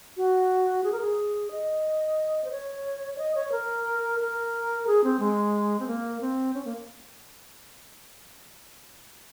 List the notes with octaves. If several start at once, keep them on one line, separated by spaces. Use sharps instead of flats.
F#4
G#4
A#4
G#4
D#5
C5
C#5
C#5
D#5
C#5
A#4
A#4
G#4
C4
G#3
C4
A#3
C4
C#4
A#3